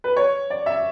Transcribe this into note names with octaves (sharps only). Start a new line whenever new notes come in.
B4
C#5
D5
E5